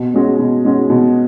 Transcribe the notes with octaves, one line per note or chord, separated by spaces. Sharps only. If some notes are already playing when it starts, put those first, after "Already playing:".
Already playing: B2
G#3 C#4 F#4
B2
G#3 C#4 F#4
B2